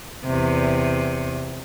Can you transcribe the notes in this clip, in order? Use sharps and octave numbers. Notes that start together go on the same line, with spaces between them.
E2 C3